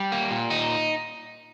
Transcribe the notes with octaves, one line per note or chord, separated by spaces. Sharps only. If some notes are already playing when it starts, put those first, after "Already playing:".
Already playing: G3
A#3
A#2
D#4